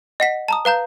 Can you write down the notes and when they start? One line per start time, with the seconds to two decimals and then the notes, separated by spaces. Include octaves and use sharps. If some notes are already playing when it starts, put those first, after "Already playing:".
0.20 D#5 F#5 B6
0.48 A5 A#5 D#6
0.65 B4 F5 A#5 G6